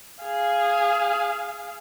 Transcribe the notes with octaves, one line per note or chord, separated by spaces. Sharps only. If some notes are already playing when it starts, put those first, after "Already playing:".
G#4 F5